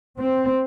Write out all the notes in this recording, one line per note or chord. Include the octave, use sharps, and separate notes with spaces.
C4